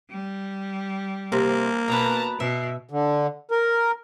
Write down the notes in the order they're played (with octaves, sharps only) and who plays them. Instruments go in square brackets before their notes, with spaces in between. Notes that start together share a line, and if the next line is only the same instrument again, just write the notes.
[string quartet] G3
[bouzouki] C3 [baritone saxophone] A#3
[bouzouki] B2 B4 [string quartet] A5 A#5
[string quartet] B2 [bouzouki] E5
[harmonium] D3
A#4